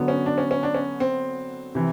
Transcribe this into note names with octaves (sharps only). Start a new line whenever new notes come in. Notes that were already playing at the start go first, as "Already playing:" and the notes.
Already playing: D3 F#3 B3
C#4
D4
C#4
C#4
D4
C#4
C4
C3 E3